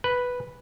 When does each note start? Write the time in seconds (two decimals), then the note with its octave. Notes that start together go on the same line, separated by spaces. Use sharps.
0.04 B4